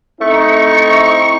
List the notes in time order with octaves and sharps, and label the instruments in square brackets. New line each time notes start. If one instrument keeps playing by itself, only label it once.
[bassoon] A3 [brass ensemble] C4 D#4 E4 [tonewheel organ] C#6